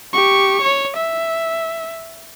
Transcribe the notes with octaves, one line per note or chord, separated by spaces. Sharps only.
G4 C#6
C#5
E5